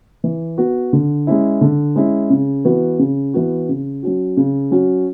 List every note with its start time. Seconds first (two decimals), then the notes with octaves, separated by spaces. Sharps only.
0.24 E3
0.58 B3 F#4
0.93 D3
1.27 G#3 C#4 E4
1.61 D3
1.96 G#3 C#4 E4
2.30 C#3
2.65 E3 B3 F#4
2.99 C#3
3.34 E3 B3 F#4
3.69 C#3
4.03 F#3 C#4 F#4
4.37 C#3
4.71 F#3 C#4 F#4